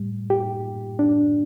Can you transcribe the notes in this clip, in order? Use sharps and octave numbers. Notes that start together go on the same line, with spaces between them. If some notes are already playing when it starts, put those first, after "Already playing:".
Already playing: A2 G3
G4
D4